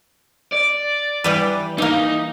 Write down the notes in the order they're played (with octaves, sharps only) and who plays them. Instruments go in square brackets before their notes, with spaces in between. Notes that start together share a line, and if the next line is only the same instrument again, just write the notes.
[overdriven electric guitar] D5
[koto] E3 G3 B4
[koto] E3 A#3 [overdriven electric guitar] D#4